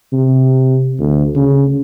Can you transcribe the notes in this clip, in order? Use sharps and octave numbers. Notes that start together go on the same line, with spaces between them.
C3
D2
C#3